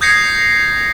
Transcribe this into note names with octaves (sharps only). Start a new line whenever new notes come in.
D#6 G6 G#6 A#6 C7 C#7